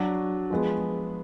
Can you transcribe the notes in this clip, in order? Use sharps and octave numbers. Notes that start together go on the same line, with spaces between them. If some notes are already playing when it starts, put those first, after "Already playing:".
Already playing: F#3 D4 F#4
F3 G#3 B3